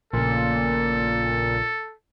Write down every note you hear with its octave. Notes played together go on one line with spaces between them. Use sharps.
A#1 A#2 C#3 A4